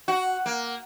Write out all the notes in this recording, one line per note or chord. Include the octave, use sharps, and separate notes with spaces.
F#4
A#3